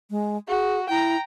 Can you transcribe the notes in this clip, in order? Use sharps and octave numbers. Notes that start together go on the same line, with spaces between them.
G#3
F#4 G#4
E4 G5 A#5